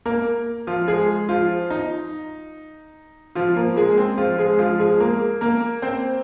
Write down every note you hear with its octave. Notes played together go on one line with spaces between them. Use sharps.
A#3 A#4
F3 F4
G#3 G#4
F3 F4
D#4
F3 F4
A#3 A#4
G#3 G#4
C4
F3 F4
G#3 G#4
F3 F4
G#3 G#4
A#3 A#4
A#3 A#4
C4 C5